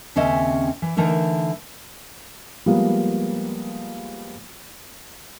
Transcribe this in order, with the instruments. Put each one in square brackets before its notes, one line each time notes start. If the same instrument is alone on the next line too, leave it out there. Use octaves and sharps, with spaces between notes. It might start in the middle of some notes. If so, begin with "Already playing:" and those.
[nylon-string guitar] D#2 C#3 C4 C#4 D#5 E5
E3
D3 E3 A3 D#4 A#4
[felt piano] F3 G3 G#3 A#3 B3